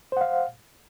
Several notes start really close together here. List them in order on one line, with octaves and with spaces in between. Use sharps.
C5 F#5 F5